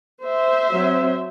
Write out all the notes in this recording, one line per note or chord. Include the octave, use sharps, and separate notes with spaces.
C5 E5
F#3 C4